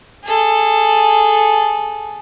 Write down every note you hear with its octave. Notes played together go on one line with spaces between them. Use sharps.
G#4 A4